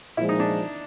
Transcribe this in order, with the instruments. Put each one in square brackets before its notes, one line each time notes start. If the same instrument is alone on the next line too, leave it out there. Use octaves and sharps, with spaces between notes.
[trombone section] A#2 F3 G#3 [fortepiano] E4
[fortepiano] D#4
D4